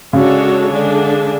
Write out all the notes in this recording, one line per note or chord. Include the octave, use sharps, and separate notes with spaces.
C#3 G#3 D4 F#4 A4 C#5
D3 G#3 D4 G#4